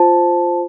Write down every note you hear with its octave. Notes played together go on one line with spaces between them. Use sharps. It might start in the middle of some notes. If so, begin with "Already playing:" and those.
Already playing: F4 C5 A5